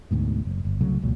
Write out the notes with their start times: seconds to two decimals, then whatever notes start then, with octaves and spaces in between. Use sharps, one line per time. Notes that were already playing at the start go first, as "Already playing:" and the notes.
0.11 D2 G#2 B2
0.45 F#1
0.65 G1
0.81 C2 C#3 F#3 A3
1.01 E1 C#2 A#2 F#3